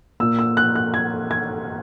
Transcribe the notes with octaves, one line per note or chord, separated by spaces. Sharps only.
A#2 A#3 E6
E6
F#6
F#6
G#6
G#6